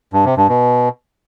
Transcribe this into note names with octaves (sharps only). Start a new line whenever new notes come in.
G2
C3
G2
B2